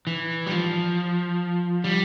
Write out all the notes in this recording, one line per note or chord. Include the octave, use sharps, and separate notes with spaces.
E3
G3
F3
G3